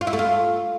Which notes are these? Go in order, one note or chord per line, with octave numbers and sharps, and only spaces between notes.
F4
E4
A3
F4